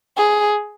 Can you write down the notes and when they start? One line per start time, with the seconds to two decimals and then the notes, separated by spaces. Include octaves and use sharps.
0.17 G#4